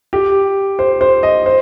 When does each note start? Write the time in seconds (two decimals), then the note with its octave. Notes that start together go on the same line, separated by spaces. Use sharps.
0.13 G4
0.79 C5
1.01 C5
1.23 D#5
1.46 C5